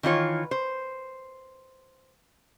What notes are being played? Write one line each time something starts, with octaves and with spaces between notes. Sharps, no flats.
D#3 E3 F4 C#5
C5